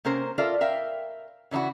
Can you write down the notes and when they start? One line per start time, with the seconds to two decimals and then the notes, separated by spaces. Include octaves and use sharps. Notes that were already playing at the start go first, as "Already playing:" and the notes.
0.05 C3 A#3 C#4 A#4 C5
0.38 F4 A4 A#4 D5 E5
0.61 A#4 E5 F5 G5
1.51 C#3 E3 D#4 E4 F#4